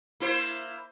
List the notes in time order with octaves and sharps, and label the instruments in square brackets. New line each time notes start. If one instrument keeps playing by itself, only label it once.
[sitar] A#3 E4 C5